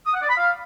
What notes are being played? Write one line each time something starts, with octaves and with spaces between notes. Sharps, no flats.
D#6
F#5
D5
B5
F5